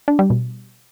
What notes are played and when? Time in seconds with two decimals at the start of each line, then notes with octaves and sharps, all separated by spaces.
0.08 D4
0.19 G3
0.30 B2